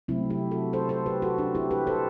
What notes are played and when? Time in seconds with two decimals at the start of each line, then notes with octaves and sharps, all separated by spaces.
0.08 C3 F#3 A3 C4 E4
0.30 E4 G4
0.51 F#4 A4
0.73 A4 C5
0.89 A4 C5
1.06 G4 B4
1.22 F#4 A4
1.38 D4 F#4
1.55 E4 G4
1.71 G4 B4
1.87 A4 C5